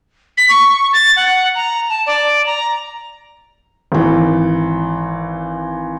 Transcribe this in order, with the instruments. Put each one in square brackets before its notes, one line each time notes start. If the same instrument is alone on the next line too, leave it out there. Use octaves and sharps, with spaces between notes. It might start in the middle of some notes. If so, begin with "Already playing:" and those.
[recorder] B6
C#6
A6
F#5
A#5
A5
D5
A#5
[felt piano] G#1 E3